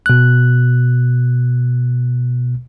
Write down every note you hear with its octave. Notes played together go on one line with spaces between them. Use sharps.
B2 F#6